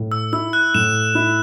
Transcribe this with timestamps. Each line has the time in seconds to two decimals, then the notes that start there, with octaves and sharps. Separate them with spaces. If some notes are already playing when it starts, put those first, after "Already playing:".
Already playing: A2
0.12 E6
0.33 E4 E6
0.53 F#6
0.74 A2 E7
1.15 E4